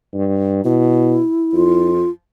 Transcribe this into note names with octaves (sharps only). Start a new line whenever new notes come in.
G2
B2 E4
F2 F4